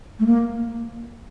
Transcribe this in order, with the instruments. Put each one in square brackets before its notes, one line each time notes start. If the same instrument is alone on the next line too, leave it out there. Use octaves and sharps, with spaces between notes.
[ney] A3
A#3